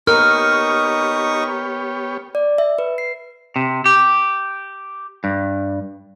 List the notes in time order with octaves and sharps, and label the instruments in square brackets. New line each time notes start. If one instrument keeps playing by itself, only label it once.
[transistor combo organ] B3 G4 C#5 [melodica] D#4 C#6 D#6 [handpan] A#4 [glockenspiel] F6
[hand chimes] D5
E5
B4
C7
[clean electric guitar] C3
G4
G2